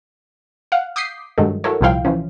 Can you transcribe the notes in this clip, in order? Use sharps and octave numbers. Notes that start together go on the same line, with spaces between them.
F5 F#5
D6 D#6 G6 B6 C7
G2 D#3 F#3 G#3 A3
E4 F#4 A4 A#4 C#5
C2 A#2 F3 E4 F5 G5
E3 F3 C#4